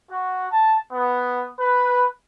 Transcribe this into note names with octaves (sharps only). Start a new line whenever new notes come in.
F#4
A5
B3
B4